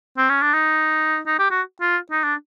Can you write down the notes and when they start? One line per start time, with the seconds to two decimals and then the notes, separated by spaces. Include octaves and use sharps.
0.17 C4
0.30 C#4
0.42 D4
0.54 D#4
1.27 D#4
1.39 G4
1.51 F#4
1.81 F4
2.11 D#4
2.24 D4